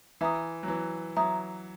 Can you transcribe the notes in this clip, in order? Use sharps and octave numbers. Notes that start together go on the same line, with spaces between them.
E3 E5 A#5 D#6
F#3
E3
F#3 E5 A#5 D#6